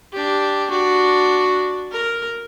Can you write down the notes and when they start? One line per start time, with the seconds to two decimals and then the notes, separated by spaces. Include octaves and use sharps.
0.13 D4 G4
0.70 D4 F#4
1.91 A#4